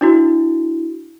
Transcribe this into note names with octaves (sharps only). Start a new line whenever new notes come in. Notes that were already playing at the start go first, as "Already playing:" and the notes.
D4 E4 F#4